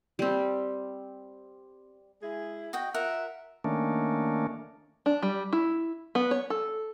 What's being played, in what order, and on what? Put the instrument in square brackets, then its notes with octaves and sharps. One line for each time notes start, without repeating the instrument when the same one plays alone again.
[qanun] G3 C4
[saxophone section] G#3 E4 G#4
[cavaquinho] F#4 D#5 G5
[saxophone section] F4 E5 [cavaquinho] A#4 F#5
[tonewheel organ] D#3 A3 A#3 C#4 D4
[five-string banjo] D4
G3
E4
B3
C#5
A4